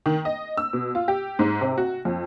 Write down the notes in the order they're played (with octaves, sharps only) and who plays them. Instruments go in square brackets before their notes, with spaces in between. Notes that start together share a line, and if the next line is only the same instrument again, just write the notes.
[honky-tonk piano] D#3
D#5
E6
B2
F4
G4
G#2
C3
F#4
F2